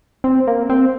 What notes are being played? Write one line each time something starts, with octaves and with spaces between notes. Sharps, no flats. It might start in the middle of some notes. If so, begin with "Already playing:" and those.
C4
A#3
C4